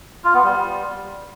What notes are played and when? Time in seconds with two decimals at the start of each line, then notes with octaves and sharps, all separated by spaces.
0.25 F4
0.34 B3
0.43 G3